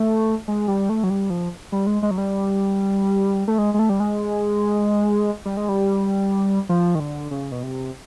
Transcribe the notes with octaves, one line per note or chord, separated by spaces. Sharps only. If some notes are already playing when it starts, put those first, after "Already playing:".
Already playing: A3
G#3
G3
A3
F#3
G3
F3
G3
G#3
G#3
F#3
G3
A3
G#3
G#3
A3
G3
G#3
G3
G#3
G3
F3
D#3
D3
C#3
B2
C3